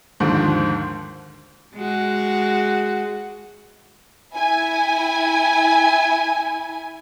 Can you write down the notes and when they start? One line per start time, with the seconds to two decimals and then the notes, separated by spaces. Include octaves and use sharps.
0.20 D#2 G#2 D3 F3
1.76 G#3 F#4
4.35 E4 G#5